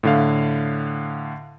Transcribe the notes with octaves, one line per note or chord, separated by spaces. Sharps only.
A2 D3 F5